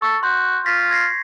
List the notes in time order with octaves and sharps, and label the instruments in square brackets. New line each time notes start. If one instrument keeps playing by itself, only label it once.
[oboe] A4 [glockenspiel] C#6
[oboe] F#4 [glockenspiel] C6 G6
[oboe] F4 [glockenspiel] A#6 B6
[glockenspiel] G#6 A#6 C7